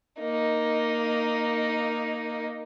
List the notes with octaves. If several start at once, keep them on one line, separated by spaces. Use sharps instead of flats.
A#3 D#4